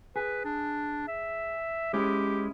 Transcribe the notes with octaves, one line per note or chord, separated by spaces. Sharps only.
G#4 B4
D4
E5
G#3 C#4 E4 G4